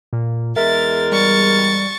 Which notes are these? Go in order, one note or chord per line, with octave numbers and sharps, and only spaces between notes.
A#2
E2 G#3 A#4 E5 A6
G3 C#6 A6